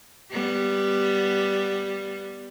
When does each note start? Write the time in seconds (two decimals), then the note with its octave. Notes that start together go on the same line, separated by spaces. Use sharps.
0.31 G3 B3